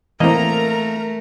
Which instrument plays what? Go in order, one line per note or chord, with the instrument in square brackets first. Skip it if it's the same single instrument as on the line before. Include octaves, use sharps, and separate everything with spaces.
[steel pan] E3 C4 [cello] A3 [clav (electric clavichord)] A#3 D#5 [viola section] A#4 A#5